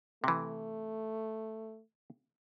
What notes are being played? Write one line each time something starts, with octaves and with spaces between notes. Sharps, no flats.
C3 E3 A3